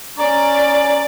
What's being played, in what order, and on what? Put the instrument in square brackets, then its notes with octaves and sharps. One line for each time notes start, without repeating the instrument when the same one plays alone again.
[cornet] C#4 [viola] D5 [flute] A#5